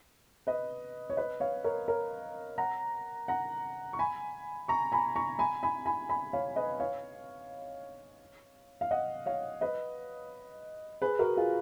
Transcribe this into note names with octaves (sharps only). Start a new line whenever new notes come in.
B4 D#5
C#5
B4 D#5
C#5 F5
A#4 C#5
A#4 C#5
F#5 A#5
F#5 A#5
C#6
G#5 B5
A#5 C#6
G#5 B5
A#5 C#6
G#5 B5
G#5 B5
G#5 B5
G#5 B5
C#5 F5
B4 D#5
C#5 F5
F5
D#5 F#5
C#5 F5
B4 D#5
G#4 B4
F#4 A#4
F4 G#4